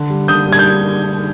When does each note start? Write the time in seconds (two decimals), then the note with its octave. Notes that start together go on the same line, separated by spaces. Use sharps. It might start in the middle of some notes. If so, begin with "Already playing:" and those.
Already playing: D3
0.10 G3
0.28 D3 D#6 G6
0.48 G3 G#6
0.59 G6